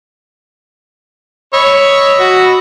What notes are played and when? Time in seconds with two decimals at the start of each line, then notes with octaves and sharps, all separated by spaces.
1.53 C#5 D#5 B5 E6
2.19 F#4